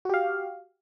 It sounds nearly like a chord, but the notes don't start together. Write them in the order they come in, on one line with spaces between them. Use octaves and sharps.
F#4 G4 F5